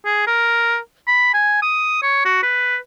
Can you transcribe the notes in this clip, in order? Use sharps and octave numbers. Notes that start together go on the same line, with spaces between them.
G#4
A#4
B5
G#5
D#6
C#5
F#4
B4